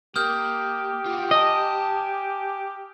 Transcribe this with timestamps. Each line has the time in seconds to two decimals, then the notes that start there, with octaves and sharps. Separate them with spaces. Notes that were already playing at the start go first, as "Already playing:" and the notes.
0.16 A#3 G4 D#6 F6 G6
1.06 F4 F#4
1.31 D#5 G#5 A5